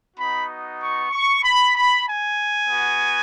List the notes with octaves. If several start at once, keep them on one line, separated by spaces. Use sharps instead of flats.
B3 D#4 F#4 B5
C#6
C#6
B5
B5
G#5
B3 F#4